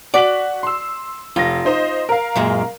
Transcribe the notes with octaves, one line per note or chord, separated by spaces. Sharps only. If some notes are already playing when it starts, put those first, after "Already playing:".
F#4 D5 B6 F#7
C6 E6
F1 F4 A#6
D#4 C5 D#5
A#4 F5
F#2 A#2 G#3